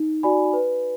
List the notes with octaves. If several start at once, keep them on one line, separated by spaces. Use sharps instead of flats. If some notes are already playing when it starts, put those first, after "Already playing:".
Already playing: D#4
F#4 D5 G#5 B5
B4